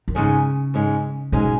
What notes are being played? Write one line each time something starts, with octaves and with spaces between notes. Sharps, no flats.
D#3
G#2 C#3 G#3 C#4
G#2 G#3 C#4
G#2 B2 G#3 C#4